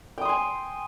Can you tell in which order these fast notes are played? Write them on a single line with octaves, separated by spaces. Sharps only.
G5 D#6 C6 G#5